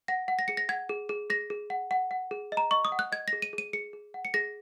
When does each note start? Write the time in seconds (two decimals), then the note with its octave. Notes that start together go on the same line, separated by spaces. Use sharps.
0.08 F#5 A#6
0.28 F#5
0.39 A#6
0.48 G#4 C#7
0.57 A#6
0.69 F#5 G#6
0.89 G#4
1.09 G#4
1.30 G#4 A#6
1.50 G#4
1.70 F#5
1.91 F#5
2.11 F#5
2.31 G#4
2.52 D#5
2.57 A#5
2.71 D#5 C#6
2.85 D#6
2.92 F#5
2.99 F#6
3.12 D#5 G#6
3.28 A#6
3.33 G#4
3.42 D#7
3.53 G#4
3.58 D#7
3.73 G#4 C#7
3.93 G#4
4.14 F#5
4.25 C#7
4.34 G#4 A#6